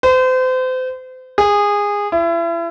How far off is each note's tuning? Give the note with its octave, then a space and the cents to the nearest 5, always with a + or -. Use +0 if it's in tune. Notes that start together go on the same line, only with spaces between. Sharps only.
C5 -35
G#4 -20
E4 +35